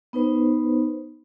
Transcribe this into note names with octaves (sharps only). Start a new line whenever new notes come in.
B3 D#4 B4 C5